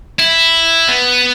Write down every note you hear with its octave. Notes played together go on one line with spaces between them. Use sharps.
E4
B3